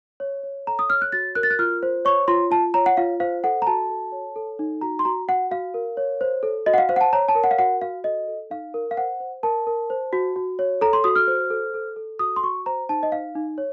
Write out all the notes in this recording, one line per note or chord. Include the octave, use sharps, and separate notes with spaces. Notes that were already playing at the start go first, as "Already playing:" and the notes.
C#5
C#5
A4 A#5
D#6
C#5 F6
F#6
F#4 A6
A#4 F#6
A6
F#6
F4 F6
C5
C#5 C#6
F4 C6
F4 A5
C#5 A#5
F#5
F4 F5
C5 F5
A4 F#5
A#5
F#4 A5
A4
C#5
A4
D#4
F#4 A#5
C6
F#4 A#5
F#4 F#5
F#4 F5
A#4
C#5
C5
A4
F#4 D#5
F#5
F5
C5 F5
F#5
A5
C#5 A#5
A5
A#4
F#5
F5
F#4 F#5
F#4 F5
A4 D#5
A4
D#4 F5
A#4
F5
C5 F#5
C5
A#4 A5
A#4
C5
F#4
F#4
C#5
A4 A#5
C6
F#4 D#6
F6
C5
A4
A4
A4
F#4 D#6
C6
F#4 C#6
C5 A#5
D#4 A5
D#5
D#4 F5
D#4
C#5